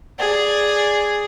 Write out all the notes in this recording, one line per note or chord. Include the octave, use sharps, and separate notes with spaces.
G#4 D5